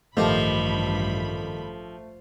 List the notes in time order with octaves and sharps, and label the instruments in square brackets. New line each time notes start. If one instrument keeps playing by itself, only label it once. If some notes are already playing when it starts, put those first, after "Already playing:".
[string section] A1 G2 B5 [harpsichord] D#3 G4 [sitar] F3 [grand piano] A3